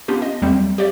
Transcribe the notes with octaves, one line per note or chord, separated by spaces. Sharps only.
B3 C#4 D4 F4 G4
D#5
E2 F#3 G3 A3 C4
G4 C#5 D5 E5